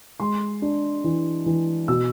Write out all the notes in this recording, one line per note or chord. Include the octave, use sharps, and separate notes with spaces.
G#3 C6
D4
E3
E3
B2 E6